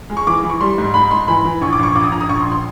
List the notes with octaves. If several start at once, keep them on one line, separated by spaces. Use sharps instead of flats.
G#3
C#6
E3 D6
E3 D6
C#6
G3 C6
G#2
G#2 B5
G#2 C6
E3 B5
E3
A#1 C#6
D6
A#1 C#6
A#1 D6
D#6
A#1 A#5
D#6
A#1 C#6
C6
A#1
C6